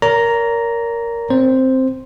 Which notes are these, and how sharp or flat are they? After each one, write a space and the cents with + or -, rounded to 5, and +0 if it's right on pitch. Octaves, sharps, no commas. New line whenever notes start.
A#4 +0 C#5 +45 A#5 +0
C4 +0 C5 +0